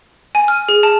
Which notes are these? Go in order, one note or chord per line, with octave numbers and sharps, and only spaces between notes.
G#5
F6
G#4
A5